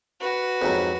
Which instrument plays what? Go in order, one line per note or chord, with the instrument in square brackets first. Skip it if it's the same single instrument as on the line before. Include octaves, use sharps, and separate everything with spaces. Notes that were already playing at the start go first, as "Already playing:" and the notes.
[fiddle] F#4 B4
[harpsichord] F2 G#2 F#3